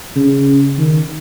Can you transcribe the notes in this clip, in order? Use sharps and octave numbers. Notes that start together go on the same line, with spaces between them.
C#3
D#3